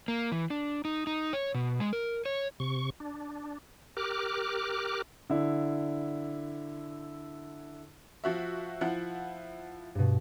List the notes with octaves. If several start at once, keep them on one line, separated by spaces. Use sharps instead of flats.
A#3
E3
D4
D#4
D#4
C#5
B2
G#3
A#4
C#5
C3 C#6
D4
G4 A#4 D6 F6 F#6
D3 E4
F3 F#4 E5 C#6
F3 E4 F#5
G2 B2